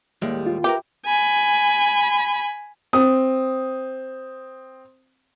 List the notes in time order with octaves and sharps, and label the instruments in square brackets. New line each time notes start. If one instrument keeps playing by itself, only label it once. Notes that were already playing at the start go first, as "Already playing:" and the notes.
[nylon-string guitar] D#2 [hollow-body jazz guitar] A2 G3 G#3
[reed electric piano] F4
[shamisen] G4 [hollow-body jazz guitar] A#4 B4 G5 [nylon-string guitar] E5
[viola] G#5 B5
[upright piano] C4 D#6